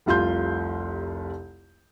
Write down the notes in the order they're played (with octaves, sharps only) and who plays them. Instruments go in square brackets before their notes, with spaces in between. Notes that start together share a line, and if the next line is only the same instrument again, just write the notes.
[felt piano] F1 C2 F4 C6 G6